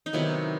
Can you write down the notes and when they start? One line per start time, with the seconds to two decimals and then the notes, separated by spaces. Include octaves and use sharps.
0.06 D#4
0.13 C3 D#3 F#3 B3 E4